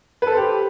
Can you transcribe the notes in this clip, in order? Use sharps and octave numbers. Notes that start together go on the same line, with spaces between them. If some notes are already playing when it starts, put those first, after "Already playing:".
G4 A4 B4 C5